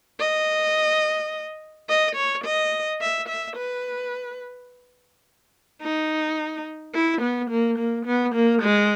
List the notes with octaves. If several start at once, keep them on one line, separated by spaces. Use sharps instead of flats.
D#5
D#5
C#5
D#5
E5
E5
B4
D#4
E4
B3
A#3
A#3
B3
A#3
G#3